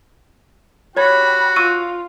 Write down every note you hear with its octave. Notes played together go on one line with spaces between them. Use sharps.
F#4 G4 C#5 B5 G#6
F4 C#6 E6 D#7